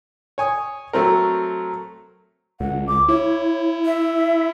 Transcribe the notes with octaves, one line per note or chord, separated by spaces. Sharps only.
C#5 G#5 D#6
F#3 A3 C4 A#4
C#2 F#5
D6
E4 C#5
E5